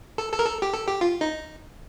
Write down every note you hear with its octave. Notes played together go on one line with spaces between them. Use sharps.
A4
A4
A#4
A4
G4
A4
G4
F4
D#4